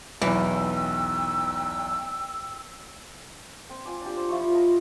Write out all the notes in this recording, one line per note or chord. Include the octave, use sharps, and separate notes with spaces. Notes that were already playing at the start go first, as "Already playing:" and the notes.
B1 E2 E3 G5 E6
C4
F4 G#5 D6
D4 G4
C5
F3 E4 F4 C#6
D#5 A#5